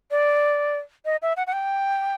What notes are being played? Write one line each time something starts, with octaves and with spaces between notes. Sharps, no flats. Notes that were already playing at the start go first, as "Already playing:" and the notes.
D5
D#5
E5
F#5
F#5
G5